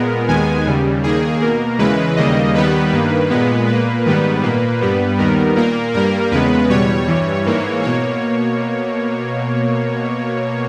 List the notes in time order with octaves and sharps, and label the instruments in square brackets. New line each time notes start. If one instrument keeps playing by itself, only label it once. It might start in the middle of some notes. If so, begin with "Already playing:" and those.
Already playing: [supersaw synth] A#2 G#3 B3 A#4
D#2 D#3 G#3 B3 G#5
D#2 C#3 G3
D#2 D#3 A#3 G#4
B2 A#3 A#4
E2 C#3 E3 G#3 B4
D#2 C#3 G3 A#3 D#5
D#2 D#3 G3 B3 B4
G2 D#3 A#3
A#2 G#3 B3
A#2 A#3 B4
G#2 D#3 G3 B3 B4
A#2 A#3
G2 G3 B3
D#2 D#3 G3 B3 A#4
A#2 A#3 A#4
G2 G3 A#3 A#4
E2 C#3 G#3 B3 B4
E2 B2 G3 C#5
G2 E3 G3
G#2 E3 A#3
B2 A#3 C#5